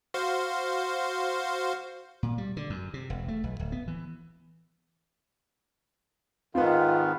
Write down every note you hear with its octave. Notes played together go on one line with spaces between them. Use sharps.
F#4 C5 F5
A#2
G3
D3
F#2
C3
E1
A3
B1
D1
B3
E3
G#2 D#3 B3 C4 F4 B4